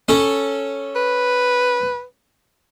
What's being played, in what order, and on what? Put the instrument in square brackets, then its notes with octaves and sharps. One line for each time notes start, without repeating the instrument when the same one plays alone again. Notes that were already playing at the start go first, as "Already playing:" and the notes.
[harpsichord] C#4 A4
[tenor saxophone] B4